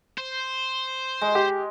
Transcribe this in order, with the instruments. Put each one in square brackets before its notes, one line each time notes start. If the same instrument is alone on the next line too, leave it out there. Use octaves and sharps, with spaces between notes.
[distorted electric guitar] C5
[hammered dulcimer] G#3
[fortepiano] G4